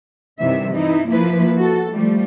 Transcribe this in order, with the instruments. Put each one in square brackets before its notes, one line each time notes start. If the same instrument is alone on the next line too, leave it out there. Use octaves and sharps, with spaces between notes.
[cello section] G2 C3 D#3 E3 E5
E3 D#4 E4
F3 A#3 E4 B4
F#4 A4
F3 G3 A3